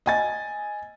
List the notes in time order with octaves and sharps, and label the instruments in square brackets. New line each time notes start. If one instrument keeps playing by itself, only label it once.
[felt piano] D#5 G#5 A6